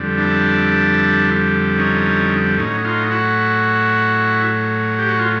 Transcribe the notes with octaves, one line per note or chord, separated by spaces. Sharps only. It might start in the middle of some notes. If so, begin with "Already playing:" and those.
Already playing: F2 D3 G3
D4 E4
C#4 D#4
A2 F#3 C#4 D#4
D#4 F4
E4 F#4
G4
F#4
F4